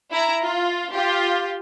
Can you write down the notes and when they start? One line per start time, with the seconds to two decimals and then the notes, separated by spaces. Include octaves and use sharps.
0.11 E4 A#5
0.43 F4
0.91 F4 G4